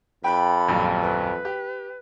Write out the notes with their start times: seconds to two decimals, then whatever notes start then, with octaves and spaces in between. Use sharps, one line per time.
0.24 F2 G5 B5
0.68 D#1 A#1 F#2
1.02 B4
1.45 G4